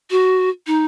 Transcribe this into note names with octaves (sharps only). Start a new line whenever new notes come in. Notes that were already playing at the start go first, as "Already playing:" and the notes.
F#4
D#4